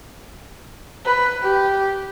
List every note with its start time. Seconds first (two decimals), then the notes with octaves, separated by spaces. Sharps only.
1.06 B4
1.42 G4